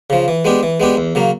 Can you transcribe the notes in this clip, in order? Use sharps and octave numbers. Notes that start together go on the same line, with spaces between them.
C#3 F3
E3
G#3 B3 D4 G4
E3
G#3 B3 D4 G4
E2
C#3 F#3 A#3